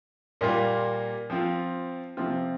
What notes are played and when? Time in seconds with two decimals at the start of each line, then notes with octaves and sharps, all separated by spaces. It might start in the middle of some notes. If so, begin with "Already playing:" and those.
0.41 A#2 G3 A#3 F4
1.30 F3 C4 F4
2.17 C3 F3 C4 F4